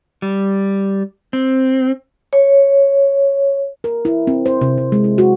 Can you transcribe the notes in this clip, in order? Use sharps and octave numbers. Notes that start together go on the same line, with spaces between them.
G3
C4
C#5
A#4
E4
C4
C5
C3
C3
G#3
E4
F#4